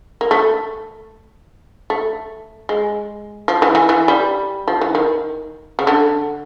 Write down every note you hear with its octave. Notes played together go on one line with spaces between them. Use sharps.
A#3
A3
A3
G#3
F3
E3
E3
E3
G3
F3
E3
D#3
C#3
D3